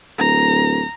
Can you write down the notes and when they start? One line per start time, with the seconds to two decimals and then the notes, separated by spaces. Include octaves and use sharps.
0.18 D1 A#5